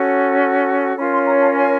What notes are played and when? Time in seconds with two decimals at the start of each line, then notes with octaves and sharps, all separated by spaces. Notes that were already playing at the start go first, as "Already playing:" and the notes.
Already playing: C#4 F#4 A4
0.98 C#4 F4 A#4 C#5 B5
1.13 C6
1.26 A#5
1.42 A5
1.55 G#5